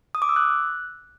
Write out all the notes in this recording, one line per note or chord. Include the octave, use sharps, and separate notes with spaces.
D#6
D6
E6
F#6